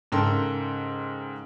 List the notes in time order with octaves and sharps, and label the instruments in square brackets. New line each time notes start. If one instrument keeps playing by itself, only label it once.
[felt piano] G#2 C#3 A4 A#4 G5 C6